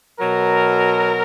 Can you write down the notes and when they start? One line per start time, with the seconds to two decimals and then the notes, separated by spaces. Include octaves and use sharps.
0.20 B2 F#3 A#4